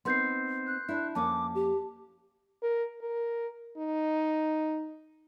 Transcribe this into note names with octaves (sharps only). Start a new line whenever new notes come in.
B3 C4 D#4 C6 G6 C7
F#6
D4 E4
F2 A#3 C#4 A5 D6
G4
A#4
A#4
D#4